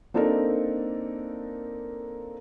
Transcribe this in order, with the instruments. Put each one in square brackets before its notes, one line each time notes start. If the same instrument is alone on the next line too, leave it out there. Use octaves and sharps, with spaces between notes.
[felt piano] A#3 C4 D4 D#4 A4 A#4